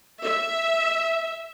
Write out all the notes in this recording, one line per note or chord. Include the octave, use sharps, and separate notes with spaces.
E5